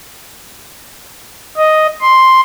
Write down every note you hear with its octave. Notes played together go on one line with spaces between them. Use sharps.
D#5
C6